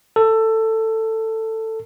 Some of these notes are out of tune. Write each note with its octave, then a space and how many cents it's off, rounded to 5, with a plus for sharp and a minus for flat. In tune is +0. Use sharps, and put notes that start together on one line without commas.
A4 +15